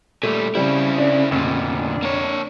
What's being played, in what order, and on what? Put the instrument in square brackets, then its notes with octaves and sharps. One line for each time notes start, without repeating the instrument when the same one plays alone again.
[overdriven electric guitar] A#2 G3 [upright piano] A3
[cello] C#3 [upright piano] G3 [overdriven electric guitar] C4 E4
[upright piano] D4
[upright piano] F1 [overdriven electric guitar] D2 A#2
[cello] D4
[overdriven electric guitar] A#3 C#5